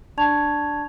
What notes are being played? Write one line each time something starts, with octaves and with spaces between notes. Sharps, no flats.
D4 D5 A5 C#6 G#6 F7